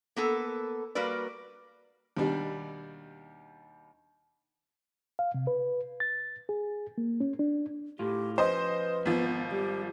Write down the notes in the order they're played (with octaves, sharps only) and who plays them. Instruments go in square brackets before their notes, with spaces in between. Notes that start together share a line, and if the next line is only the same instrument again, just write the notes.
[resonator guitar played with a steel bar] A#3 B3 A4
G3 A#3 F#4 A#4 B4 D5
[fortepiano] D#2 B2 G3 D4
[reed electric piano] F5
C3
B4
A6
G#4
A#3
C#4
D4
[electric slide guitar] A2 F4 [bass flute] G4
[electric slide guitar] F3 C#4 [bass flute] B4 [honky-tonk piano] C5 D#5
[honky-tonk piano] G#1 F3 [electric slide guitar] B3
[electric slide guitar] G3 [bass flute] G4